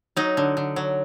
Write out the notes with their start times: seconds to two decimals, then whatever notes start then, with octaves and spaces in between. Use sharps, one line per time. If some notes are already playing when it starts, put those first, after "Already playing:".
0.16 F#3 D#4
0.37 D3
0.57 D3
0.76 F#3